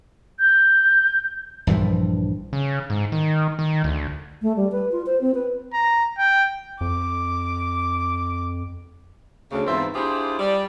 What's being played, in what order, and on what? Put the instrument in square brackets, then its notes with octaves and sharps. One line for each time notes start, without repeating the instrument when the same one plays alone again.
[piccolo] G6
[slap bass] A#1 G2 E3 F3
[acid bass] C#3
G#2
D#3
D#3
D2
[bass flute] A3
G3
B4
F4
C5
C4
B4
[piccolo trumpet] A#5
G5
[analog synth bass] F2 [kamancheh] D6
[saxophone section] D2 C#3
E2 G#2 B2 C4 F4 E5
D4 E4 F4 G4 G#4 C5
G3 D5